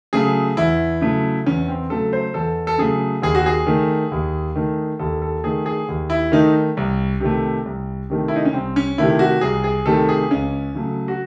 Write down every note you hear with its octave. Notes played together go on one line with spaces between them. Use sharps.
C#3 F#3 A3 G#4
E2 E4
C#3 F#3 A3
E2 C#4
C4
C#3 F#3 A3 A4
C5
E2 A4
A4
C#3 F#3 A3 G#4
D#2 G#4
F#4
G#4
D#3 A3
D#2
D#3 A3
D#2 A4
A4
D#3 A3 G#4
G#4
D#2
E4
D#3 A3 D#4
C2
C3 D#3 A3
C2
C3 D#3 A3
E4
D#4
C#4
C2 C4
C#4
C3 D#3 A3 E4
F#4
C2 G#4
G#4
C3 D#3 A3 A4
G#4
C#2 C#4
C#3 F#3 A3
F#4